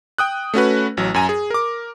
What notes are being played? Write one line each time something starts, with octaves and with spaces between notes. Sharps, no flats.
G5 D#6 F#6
A3 C#4 F#4 B4
A1 F#3
F#2 G#5 A#5
G#4
A#4 D6